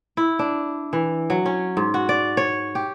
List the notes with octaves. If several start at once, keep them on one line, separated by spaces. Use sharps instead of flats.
E4
D4
E3
F#3
C#4
G#2
F#4
D5
C#5
G4